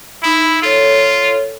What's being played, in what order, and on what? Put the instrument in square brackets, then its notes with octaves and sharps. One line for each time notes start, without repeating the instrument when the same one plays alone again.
[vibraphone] D#4 B5 [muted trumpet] E4
[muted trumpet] F4 [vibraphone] A4 C#5